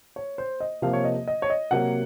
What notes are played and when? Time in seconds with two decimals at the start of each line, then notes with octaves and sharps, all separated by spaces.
0.16 C#5
0.38 C5
0.60 D#5
0.82 C3 F3 A#3 F5
0.93 C#5
1.04 D#5
1.28 D#5
1.42 C#5
1.50 D#5
1.71 C3 F#3 A#3 F#5